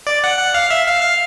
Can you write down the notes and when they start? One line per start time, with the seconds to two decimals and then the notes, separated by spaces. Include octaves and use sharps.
0.07 D5
0.24 F#5
0.39 F#5
0.54 F5
0.71 E5
0.87 F5
1.02 F5